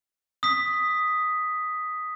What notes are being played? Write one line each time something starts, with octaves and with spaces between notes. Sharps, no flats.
D#6 B6